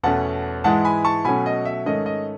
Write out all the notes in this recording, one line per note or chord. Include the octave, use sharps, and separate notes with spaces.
E2 B2 A3 C#4 F#5 A5
G#2 E3 G#3 F#5 A5
G#5 B5
A5 C#6
B2 F#3 A3 C#4 G#5 B5
D#5
E5
G#2 D#3 A3 C#4 D#5
D#5